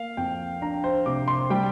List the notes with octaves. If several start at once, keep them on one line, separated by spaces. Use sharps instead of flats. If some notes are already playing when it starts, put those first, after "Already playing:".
Already playing: A#3 F5
F2 G5
D4 A#5
C5
C3 D6
C6
G3 G5